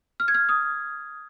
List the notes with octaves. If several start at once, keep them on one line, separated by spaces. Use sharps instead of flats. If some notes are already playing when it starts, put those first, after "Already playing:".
F6
G#6
F6
D#6